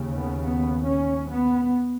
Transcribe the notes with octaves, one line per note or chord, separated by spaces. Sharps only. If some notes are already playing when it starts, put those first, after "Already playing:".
Already playing: D#2 C#3
B3
B3
C#4
B3